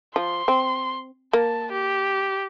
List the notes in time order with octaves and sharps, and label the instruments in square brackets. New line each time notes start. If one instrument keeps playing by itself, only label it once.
[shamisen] F3 [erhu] C6
[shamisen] C4
[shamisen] A#3 [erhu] A5
[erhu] G4